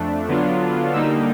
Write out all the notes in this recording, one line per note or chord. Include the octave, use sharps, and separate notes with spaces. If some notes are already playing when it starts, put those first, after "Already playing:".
Already playing: F2 A3 D4
D3 F#3 B3 D4 F4
D3 G3 A#3 D#4 E6